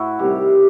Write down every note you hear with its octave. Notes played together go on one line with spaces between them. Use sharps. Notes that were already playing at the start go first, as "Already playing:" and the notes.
Already playing: A2 E4 F#4
C3 D#3 G3 G4